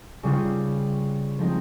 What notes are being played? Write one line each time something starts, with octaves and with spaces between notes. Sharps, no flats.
C#3 G3 C#4 F4
F3 G#3 C4 D#4